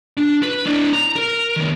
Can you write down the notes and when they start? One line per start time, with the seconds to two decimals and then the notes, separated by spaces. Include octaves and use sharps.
0.17 D4
0.43 B4
0.66 D4 E4
0.93 A#5
1.16 A#4
1.56 D#3 B3